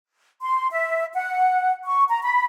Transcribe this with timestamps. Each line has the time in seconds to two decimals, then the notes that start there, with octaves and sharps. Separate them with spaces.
0.41 C6
0.71 E5
1.14 F#5
1.85 C#6
2.09 A#5
2.22 B5